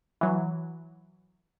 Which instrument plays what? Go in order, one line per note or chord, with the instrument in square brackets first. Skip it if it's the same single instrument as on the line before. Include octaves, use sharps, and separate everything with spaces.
[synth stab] E3 F#3